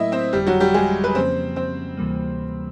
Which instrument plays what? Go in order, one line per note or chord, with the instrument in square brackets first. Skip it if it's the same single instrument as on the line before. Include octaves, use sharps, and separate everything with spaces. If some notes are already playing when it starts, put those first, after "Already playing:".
Already playing: [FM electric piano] A2 F#3 A3 [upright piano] A#3 E4 D#5 E5
[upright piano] C4 C5
[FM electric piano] G1 F2 D3 [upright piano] G3 G4
[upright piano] F#3 F#4
G3 G4
G#3 G#4
B4
[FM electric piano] F2 C#3 F3 A#3 C#4 [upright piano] C4 C5
[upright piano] C4 C5
[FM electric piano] D2 C3 E3 G3 A#3